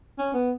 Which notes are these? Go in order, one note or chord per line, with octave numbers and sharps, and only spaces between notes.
C#4
B3